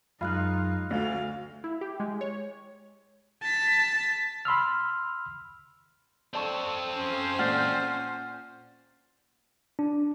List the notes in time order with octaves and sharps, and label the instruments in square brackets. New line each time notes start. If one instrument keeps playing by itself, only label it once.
[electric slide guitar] F#2 G#3 [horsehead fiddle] D#4 [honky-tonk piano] F4 [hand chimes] B5 F6 F#6
[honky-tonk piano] D2 [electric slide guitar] A3 F#4 A4 [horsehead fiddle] F5
[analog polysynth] E4
G4
G#3
C#5
[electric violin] A5 B6
[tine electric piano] B5 C6 E6 F6
[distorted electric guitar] C4 A4 [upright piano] D5 A5 C#6
[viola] C#4 C5
[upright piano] A#2 D5 [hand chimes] F#5 F6 A6
[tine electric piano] D4